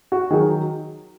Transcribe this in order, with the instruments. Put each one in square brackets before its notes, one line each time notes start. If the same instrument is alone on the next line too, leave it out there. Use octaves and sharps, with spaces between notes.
[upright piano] F#4
D#3 F#3 G#4